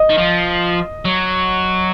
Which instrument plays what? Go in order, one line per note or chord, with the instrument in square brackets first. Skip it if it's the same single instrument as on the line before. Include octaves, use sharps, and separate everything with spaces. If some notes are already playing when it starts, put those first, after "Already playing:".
Already playing: [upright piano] D#5
[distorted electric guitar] D#3
F3
F#3